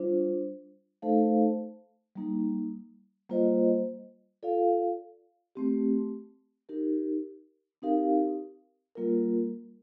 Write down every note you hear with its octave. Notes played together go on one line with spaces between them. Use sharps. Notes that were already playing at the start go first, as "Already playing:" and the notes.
Already playing: G3 D4 F4 C5
A3 D#4 A4 C5 F5
G3 A#3 D#4
G3 A#3 F4 C5 D#5
F4 A4 D5 F5
A3 C4 G4
D#4 G4 A#4
C4 D#4 G4 A#4 F5
G3 A#3 F4 A#4